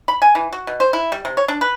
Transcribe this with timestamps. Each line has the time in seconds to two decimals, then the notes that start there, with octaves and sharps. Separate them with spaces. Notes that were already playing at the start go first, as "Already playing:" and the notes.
0.08 B5
0.22 G#5
0.35 E3
0.53 F#4
0.67 B2
0.80 C5
0.93 E4
1.12 G3
1.25 C3
1.37 C#5
1.48 D4
1.61 B4